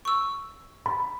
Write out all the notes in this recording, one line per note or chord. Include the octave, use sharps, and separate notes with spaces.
C#6 E6
B5